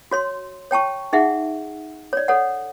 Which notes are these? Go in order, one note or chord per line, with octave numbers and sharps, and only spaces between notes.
F#4 C#5 C6
C#5 G5 A5 C#6
D#4 G#4 E5 F#5
C#5 D5
A4 C#5 F#5